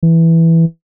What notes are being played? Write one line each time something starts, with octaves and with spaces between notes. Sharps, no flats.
E3